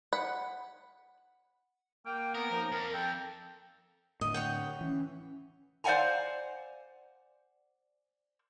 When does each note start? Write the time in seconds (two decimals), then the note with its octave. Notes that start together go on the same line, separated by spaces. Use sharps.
0.13 F#5 B5
2.06 A#3 G5
2.35 B3 A#4
2.51 F#2 F3 D#4
2.72 F2 A#4
2.94 A4 G5
4.21 A2 D3 D#5
4.34 C#5 F#5 G5
4.81 E3 C#4
5.84 C5 D5 F5 F#5 G#5 A#5